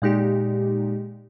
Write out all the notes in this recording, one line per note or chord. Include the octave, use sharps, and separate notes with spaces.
A#2 G#3 D#4 G4